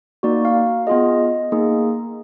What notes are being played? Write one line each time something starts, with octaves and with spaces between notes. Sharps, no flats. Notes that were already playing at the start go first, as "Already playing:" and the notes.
A#3 D#4 F#4 D5
F5
B3 F4 G#4 D#5
A#3 D#4 G#4